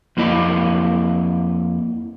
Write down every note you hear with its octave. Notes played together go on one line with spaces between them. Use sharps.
F2 A#3 E4 D#5